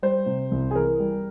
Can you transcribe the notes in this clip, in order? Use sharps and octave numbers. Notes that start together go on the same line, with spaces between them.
G3 C5
C3
C2
G#4
E3 A#4
G3